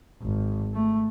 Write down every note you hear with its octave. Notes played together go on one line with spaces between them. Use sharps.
G#1
A3